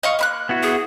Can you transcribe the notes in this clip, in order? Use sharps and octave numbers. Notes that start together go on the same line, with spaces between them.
D#5 F5 C#6
A#3 B5 F#6
B3 E4 F#4
G#4